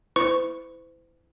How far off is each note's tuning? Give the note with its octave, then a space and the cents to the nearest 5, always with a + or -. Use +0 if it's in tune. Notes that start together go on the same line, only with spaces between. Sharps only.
E4 +0 C5 -45 C#6 +0